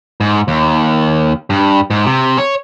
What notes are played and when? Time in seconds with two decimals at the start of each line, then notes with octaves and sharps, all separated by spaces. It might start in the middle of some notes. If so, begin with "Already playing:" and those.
0.21 G#2
0.48 D#2
1.50 G2
1.90 G#2
2.06 C3
2.38 C#5